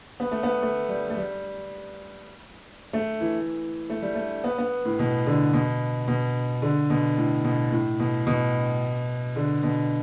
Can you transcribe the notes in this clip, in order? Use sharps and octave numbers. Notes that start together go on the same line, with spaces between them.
B3
A3
B3
A3
G3
A3
G3
A3
E3
A3
G3
A3
B3
B3
A2
B2
D3
B2
B2
D3
B2
A2
B2
A2
B2
B2
D3
B2